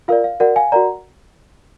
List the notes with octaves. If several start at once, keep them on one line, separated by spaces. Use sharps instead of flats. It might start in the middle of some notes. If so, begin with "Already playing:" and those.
F4 A#4 D5 F5
F5
F#4 A#4 D5 F#5
F5 G#5
F#4 A#4 D5 F#5 A#5